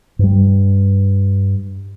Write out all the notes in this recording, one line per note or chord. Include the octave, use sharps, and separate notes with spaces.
G2 G3